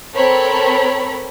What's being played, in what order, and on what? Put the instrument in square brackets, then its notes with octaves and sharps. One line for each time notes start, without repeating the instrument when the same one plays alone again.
[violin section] C4 A4 A#4 C#5 B5